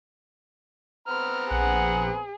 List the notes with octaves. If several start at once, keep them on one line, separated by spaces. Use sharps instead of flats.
B3 C4 A#5 F6
A#1 G#4 F#5